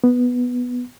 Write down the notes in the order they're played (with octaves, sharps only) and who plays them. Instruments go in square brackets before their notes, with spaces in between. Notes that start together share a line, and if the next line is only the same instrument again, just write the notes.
[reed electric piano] B3